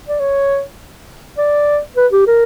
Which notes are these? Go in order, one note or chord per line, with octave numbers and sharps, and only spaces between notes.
D5
C#5
D5
B4
G4
A#4